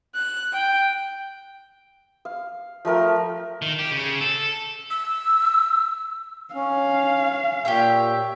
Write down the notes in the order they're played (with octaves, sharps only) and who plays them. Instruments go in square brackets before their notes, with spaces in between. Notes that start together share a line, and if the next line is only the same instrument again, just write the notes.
[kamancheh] F#6
G5
[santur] F5
F3 A3 A#4 G5
[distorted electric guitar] D#3
G4
C#3
A4
[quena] E6
[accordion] C#4 [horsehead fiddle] F5
[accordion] A#2 [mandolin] G4 C#5 E5